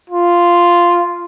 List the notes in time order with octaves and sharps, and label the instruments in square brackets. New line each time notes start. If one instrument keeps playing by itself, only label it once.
[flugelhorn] F4